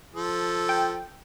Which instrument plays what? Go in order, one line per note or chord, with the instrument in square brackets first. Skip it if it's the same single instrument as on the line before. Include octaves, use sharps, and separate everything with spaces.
[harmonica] F3 A4
[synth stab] G5